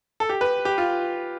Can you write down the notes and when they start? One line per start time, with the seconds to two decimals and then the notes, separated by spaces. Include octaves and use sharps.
0.20 A4
0.29 G4
0.41 B4
0.65 G4
0.78 F4